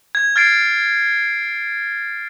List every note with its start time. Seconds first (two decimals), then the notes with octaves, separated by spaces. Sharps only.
0.15 G#6
0.36 F6 G#6 A6 C7 D7